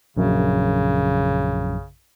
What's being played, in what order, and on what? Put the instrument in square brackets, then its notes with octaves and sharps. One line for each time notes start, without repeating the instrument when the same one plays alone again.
[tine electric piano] A#1 F#2 [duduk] C#3